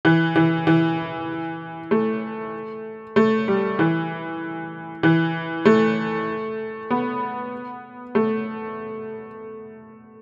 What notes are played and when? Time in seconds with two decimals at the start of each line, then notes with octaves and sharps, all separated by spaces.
0.05 E3
0.36 E3
0.67 E3
1.91 A3
3.16 A3
3.48 G3
3.79 E3
5.03 E3
5.65 A3
6.90 B3
8.15 A3